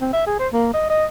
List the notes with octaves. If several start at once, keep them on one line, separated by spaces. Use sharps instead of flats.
C4
E5
G#4
C5
A#3
D#5
D#5